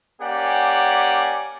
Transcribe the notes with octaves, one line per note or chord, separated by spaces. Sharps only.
A#3 C#4 G4 D5 F#5 G#5